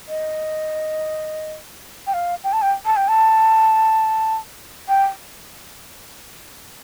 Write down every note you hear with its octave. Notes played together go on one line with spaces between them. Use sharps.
D#5
G5
F5
G5
A5
G5
A5
G5
A5
G5